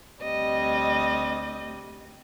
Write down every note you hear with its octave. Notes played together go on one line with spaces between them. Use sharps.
D2 C3 G3 D#5